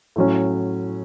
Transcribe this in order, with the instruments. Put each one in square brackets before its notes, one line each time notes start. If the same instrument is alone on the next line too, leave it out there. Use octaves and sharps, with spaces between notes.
[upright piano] A2 F#3 C#4